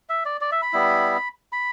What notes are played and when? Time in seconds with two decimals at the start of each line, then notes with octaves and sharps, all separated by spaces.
0.09 E5
0.25 D5
0.41 D5
0.52 E5
0.62 B5
0.73 G3 B3 E4
1.52 B5